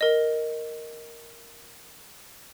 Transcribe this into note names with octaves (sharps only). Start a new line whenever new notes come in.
A#4 D#5